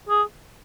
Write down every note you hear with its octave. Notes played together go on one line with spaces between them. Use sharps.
G#4